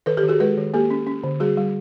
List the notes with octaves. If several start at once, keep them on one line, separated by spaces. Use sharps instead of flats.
D#3 A4 B4
G4 A4
D#3
F#4 G#4
G#3 A4 B4
D#3
A#3 G4 A4
C#4
C#4
D3
G3 F#4 G#4
G3